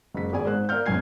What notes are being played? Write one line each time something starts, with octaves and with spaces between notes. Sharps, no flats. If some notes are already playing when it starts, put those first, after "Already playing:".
F#1 G#3 B6
G#1 G#4 D5 G#5
G#2 C5 F#6
A#4 D5 F5 F6 G6
F#1 B1 F#2 G#5 G#6 C7